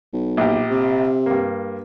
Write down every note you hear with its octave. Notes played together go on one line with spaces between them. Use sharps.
B1
A#1 G4
C3
G2 A#3